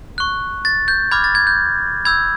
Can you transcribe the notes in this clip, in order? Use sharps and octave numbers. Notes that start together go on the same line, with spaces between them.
C#6 F#6
A6
G6
B5 D6 F6 G#6
A6
G#6
G6
B5 E6 G6 G#6